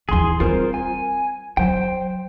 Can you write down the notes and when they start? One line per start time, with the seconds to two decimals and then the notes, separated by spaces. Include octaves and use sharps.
0.09 D#2 E3 G#4 C6
0.40 G3 C4 F4 A#4 C5
0.74 G#5
1.57 F#3 C5 G5